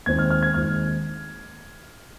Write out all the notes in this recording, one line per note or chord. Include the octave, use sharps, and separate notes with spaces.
D#2 D#3 G#3 C4 G#6
F6
F6
G#6
D#2 D#3 G#3 C4 F6